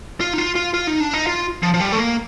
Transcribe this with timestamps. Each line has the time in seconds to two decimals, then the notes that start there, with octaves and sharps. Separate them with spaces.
0.20 F4
0.33 D#4
0.38 F4
0.55 F4
0.74 F4
0.87 D#4
1.00 D4
1.13 D#4
1.27 F4
1.63 F3
1.74 F3
1.80 G3
1.93 A3
1.98 A#3